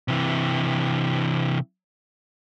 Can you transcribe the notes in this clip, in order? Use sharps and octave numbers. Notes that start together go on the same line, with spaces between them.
C3 E3